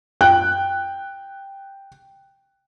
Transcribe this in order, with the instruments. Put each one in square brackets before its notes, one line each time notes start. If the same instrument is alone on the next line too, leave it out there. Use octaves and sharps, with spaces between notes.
[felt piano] G5 F#6